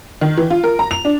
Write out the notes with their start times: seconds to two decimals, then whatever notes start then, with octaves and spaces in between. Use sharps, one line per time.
0.21 D#3
0.37 E3
0.50 F4
0.64 A#4
0.79 A#5
0.91 F7
1.05 D4